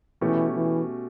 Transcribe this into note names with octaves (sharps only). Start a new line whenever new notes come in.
B2 E3 A3 C#4 G4
E3